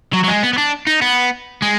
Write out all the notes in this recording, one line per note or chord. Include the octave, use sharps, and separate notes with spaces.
F#3
F#3
G#3
B3
B3
D4
D#4
B3
G#3